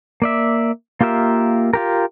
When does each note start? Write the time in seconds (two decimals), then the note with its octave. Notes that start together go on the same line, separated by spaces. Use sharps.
0.22 A#3 D5 E5
1.01 A#3 F4 G4 A#4 E5
1.73 F4 G4 A#4